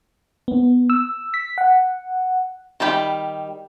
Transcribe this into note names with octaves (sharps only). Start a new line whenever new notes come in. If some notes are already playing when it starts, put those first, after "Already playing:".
B3
E6
B6
F#5
D#3 G3 F4 G4 B5